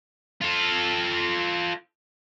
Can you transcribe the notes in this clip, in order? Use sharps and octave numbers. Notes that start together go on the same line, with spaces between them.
F4 A4